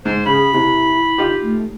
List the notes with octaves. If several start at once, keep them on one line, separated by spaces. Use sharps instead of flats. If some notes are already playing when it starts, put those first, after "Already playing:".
G#2 C5
C#3 G#4 B5
C3 E4
D#4 F4 G4
A3